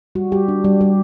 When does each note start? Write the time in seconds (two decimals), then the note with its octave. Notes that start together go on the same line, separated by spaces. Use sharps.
0.15 G3 F#4
0.32 G3 G4
0.48 D4
0.64 G3 G4
0.81 G3 G4